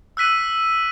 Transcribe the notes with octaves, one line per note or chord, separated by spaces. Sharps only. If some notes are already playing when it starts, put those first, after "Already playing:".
E6 F#6 B6 D#7